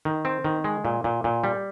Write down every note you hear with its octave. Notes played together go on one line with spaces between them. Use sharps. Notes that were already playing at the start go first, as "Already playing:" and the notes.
D#3
C4
D#3
G#3
A#2
A#2
A#2
G3